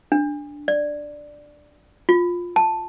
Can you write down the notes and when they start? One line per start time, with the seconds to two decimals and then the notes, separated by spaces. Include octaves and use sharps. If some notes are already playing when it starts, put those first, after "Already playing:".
0.12 D4
0.68 D5
2.09 F4
2.56 A5